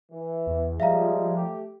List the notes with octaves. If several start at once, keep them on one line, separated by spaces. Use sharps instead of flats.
E3
E2
F3 G3 G#3 E5 F5 A#5
A3 G4